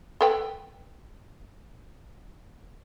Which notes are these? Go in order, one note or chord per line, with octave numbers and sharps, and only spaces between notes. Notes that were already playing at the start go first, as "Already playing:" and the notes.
A4 B4 G5